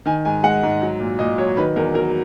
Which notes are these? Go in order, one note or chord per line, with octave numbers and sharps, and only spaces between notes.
D#3 G#5
G#2 G#5
G#3 F#5
G#2
F#3
A#2
A#2 D#5
F#3 C#5
D#3 B4
E2 A#4
F#3 A#4